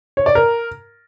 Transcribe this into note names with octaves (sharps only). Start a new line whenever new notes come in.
C#5
D5
A#4